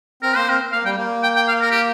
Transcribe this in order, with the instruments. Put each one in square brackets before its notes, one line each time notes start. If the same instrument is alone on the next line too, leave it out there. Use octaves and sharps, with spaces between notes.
[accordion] C4 [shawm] A#4
[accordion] A#3 [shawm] C5
[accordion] C4 [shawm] A#4
[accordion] A#3 [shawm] F5
[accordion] G3 [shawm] G5
[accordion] A#3
[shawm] G5
G5
F5
A#4
G4